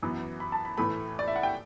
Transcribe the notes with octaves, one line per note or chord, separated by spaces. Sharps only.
F#2 E3 B3
B5
A5
B5
A2 E3 A3 B5
D5
E5
F#5
G5